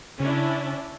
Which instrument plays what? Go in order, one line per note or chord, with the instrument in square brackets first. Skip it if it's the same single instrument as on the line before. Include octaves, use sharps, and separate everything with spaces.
[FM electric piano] C#3 [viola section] C#4 D4 E4